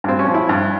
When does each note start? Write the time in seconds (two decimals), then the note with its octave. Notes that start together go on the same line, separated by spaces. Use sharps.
0.04 G2 C4
0.19 C#4
0.26 F3
0.34 E4
0.49 G2